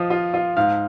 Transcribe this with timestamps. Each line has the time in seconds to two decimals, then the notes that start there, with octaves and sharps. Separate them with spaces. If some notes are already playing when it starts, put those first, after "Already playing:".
Already playing: F3 F4 D#5 F5
0.10 F4
0.34 F4
0.57 G#2 F5